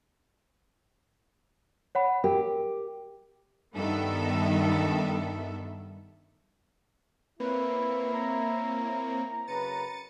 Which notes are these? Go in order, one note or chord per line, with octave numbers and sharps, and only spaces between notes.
C#5 F#5 B5
G4 A#4
G2 D#3 B3 A4 E5
A#3 C4 E4 B4 C#5
A#5
F#2 C#3 B4 A6 C#7 D#7